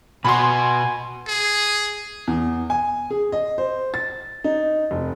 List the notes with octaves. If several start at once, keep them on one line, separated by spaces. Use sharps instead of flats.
B2 F#4 G#5 B5 C6
G#4
E2
G#5
G#4
D#5
C5
A6
D#4
F1